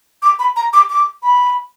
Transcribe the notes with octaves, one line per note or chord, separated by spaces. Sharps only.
D6
B5
A#5
D6
D6
B5